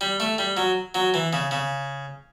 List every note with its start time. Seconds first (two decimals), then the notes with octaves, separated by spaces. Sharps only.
0.01 G3
0.20 A3
0.38 G3
0.57 F#3
0.95 F#3
1.14 E3
1.33 C#3
1.51 C#3